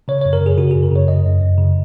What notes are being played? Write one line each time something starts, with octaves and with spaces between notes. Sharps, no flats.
C#3 C#5
F#2 C#5
A#4
C#3
G#4
C#3 F#4
F#2 G#4
A#4
C#3 C#5
F#2 D#5
F#2
F#2
C#3